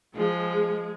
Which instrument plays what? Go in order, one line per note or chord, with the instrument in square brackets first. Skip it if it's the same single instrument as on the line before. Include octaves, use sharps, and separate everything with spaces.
[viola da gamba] F3 [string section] G#3